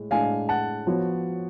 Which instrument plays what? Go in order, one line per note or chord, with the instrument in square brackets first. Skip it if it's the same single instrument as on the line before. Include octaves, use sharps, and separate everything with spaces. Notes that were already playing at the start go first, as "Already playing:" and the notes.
Already playing: [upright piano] A2 G#3
[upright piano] A2 G#3 D4 [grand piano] F5 G#5
[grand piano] F#5 A5
[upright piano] F3 B3 F#4 C#5